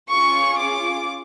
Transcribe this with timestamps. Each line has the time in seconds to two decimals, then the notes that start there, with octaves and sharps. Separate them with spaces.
0.11 C#4 F4 G#4 C#6
0.59 D6